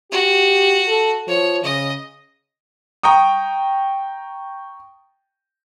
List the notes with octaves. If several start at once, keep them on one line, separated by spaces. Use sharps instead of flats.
F#4 G4
A4
F3 C#5
C#3 D#5
G5 A#5 C#6 D#6